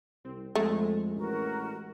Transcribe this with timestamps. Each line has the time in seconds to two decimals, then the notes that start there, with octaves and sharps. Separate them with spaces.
0.24 C2 C4
0.55 F2 G#3 A3
1.16 A1 F#4 A#4